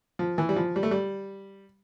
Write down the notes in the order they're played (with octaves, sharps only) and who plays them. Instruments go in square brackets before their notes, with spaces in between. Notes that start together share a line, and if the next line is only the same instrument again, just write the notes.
[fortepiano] F3
E3
G3
F3
G3
A3
G3